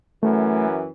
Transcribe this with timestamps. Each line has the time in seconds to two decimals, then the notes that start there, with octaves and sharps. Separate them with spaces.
0.23 F#2 E3 A3